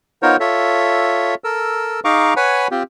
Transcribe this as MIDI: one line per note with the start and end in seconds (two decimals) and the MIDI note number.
0.23 0.37 59
0.23 0.37 63
0.23 0.37 65
0.23 0.37 70
0.23 0.37 72
0.23 0.37 73
0.40 1.35 65
0.40 1.35 69
0.40 1.35 73
0.40 1.35 76
1.44 2.00 69
1.44 2.00 70
1.44 2.00 88
2.05 2.34 63
2.05 2.34 68
2.05 2.34 77
2.05 2.34 82
2.05 2.34 85
2.05 2.34 86
2.36 2.68 71
2.36 2.68 73
2.36 2.68 78
2.36 2.68 80
2.36 2.68 83
2.71 2.83 60
2.71 2.83 65
2.71 2.83 67